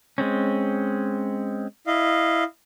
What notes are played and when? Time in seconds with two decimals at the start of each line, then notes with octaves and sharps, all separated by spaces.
0.18 G#3 C4 C#4
1.87 E4 D#5 F5